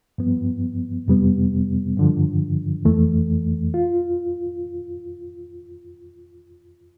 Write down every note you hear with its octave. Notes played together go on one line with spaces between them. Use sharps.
G2 F3 B3
F2 C3 G3 B3
G2 D3 F3
F2 E3 A3
F4